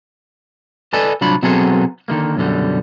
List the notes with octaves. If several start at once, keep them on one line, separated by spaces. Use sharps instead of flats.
A4 B4 D5 D#5 G#5 A5
C2 F#3 D4 F4 B5
B2 F#3 B3 C4 G#4 A4
D3 D#3 G#3 A#3
F#2 B2 D3 G3